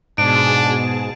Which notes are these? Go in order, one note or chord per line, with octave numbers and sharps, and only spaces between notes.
G#2 B2 D4 G#4 A5 D7